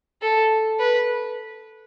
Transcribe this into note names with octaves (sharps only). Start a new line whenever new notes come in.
A4
B4